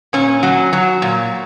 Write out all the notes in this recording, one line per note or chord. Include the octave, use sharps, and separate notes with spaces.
A#2 C#4
F#3
F#3
A#2